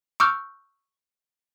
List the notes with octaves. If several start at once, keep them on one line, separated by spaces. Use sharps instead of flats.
C#6 D6 E6 F6 G6